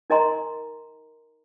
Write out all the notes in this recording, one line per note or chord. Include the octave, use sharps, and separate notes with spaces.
D#4 A#4 D#5 G#5 A#5 C6